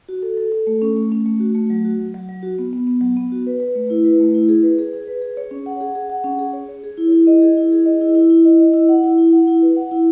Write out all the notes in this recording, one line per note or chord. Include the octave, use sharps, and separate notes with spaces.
F#4
A4
A4
A4
A3
C#4
A3
C#4
A3
F#4
A3
F#3
F#4
F#3
F#3
F#3
F#4
B3
B3
B3
F#3
B3
F#4
B4
B4
A3
E4
B4
A3
E4
G#4
B4
G#4
G#4
B4
G#4
C#5
C#4
F#5
G#4
G#4
F#5
C#4
G#4
C#5
C#5
G#4
E4
E4
D#5
G#4
E4
G#4
D#5
E4
E4
E4
D#5
D#5
E4
F#5
E4
E4
F#5
E4
B4
F#5
E4